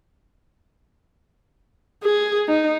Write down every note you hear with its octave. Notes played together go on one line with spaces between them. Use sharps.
G#4
D#4